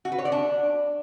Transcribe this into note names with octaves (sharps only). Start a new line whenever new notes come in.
F#4
B4
C#5
D5
D4